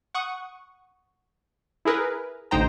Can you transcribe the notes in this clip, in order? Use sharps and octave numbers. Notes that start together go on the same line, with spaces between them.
F#5 C#6 D#6
E4 G#4 A#4 B4
A1 D2 D#4 C5 G5 A#5